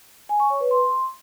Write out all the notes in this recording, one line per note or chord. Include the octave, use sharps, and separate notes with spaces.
G#5
C#6
C#5
B4
C6